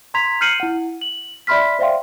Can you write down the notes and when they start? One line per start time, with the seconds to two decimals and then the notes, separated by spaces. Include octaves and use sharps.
0.14 A#5 C6 G#6 B6 F7
0.41 F6 G6 C7 C#7 D#7 F#7
0.60 E4 F#5
1.02 F#7
1.47 D5 E5 B5 C6 F6 B6
1.79 C5 D5 E5 F5 G5 C6